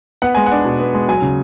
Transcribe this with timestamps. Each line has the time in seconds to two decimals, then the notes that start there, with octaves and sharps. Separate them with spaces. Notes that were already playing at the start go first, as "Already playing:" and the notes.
0.22 B3 F#5
0.35 G#3 G#5
0.46 F#5
0.52 D4
0.65 B2
0.79 B3
0.94 G#3
1.09 F#3 G#5
1.22 C#3